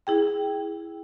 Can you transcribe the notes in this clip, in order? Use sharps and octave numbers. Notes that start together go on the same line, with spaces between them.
E4 G#4 G5